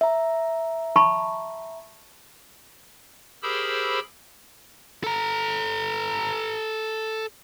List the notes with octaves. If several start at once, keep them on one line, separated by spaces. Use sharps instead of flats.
E5 A#5
A5 B5 C#6
G4 G#4 A#4 C5 B5 E6
A4 A#5